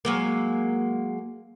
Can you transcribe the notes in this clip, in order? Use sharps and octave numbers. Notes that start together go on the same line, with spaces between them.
F#3 G#3 A#3